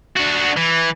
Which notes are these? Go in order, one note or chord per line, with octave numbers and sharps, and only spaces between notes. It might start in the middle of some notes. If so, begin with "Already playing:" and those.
D4 F#4
E3